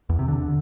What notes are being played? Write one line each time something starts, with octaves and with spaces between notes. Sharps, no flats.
E2
C3
D3